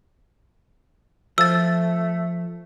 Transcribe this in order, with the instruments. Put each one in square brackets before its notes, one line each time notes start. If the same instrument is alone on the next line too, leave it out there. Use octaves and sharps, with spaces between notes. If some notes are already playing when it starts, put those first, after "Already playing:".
[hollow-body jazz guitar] F3 [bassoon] A3 [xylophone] E6 A6